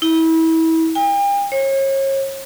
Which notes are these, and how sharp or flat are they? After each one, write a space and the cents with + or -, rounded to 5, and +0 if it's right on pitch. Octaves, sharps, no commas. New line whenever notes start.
E4 -30
G5 +40
C#5 -35